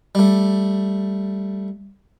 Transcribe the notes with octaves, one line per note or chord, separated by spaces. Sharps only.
G3 A3